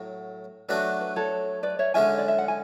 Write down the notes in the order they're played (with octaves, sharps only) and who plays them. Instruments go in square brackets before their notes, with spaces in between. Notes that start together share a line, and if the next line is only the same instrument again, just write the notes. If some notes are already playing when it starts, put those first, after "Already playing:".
Already playing: [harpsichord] A2 F#3
[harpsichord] F#3 A3 D4 F#4 [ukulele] B4 D5
[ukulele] B4
A4 C#5
B4 D5
C#5 E5
[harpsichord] D3 G#3 C#4 [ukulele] E5 G#5
[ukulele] D5
E5
F#5
G#5